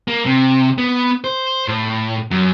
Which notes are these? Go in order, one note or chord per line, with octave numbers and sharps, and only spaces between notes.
A#3
C3
B3
C5
A2
F#2